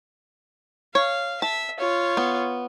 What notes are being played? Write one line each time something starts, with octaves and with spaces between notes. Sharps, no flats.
C#5 F5
E5 A5
F4 C#5
B3